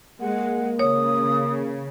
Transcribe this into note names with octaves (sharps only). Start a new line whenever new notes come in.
G#3 A#3 F#5
C#3 C#5 D#6